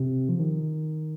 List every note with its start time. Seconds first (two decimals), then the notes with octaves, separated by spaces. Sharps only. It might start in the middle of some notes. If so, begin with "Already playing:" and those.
Already playing: C3
0.29 F3
0.39 D#3